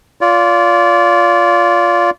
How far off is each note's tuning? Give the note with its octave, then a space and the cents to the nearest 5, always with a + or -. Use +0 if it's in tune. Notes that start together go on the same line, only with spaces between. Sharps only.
F4 +0 D5 -30